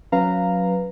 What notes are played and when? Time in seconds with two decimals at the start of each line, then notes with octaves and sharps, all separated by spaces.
0.12 F#3 C#4 B4 F5 A#5